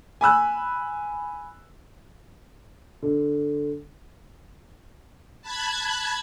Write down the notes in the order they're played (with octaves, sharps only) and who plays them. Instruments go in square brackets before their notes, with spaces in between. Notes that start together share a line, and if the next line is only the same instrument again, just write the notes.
[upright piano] G#5 B5 E6 F#6
[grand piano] D3
[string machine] A5 B5 F#6 G#6